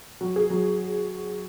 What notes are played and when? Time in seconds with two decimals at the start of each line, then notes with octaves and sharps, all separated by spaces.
0.21 F#3
0.36 G#4
0.50 F#3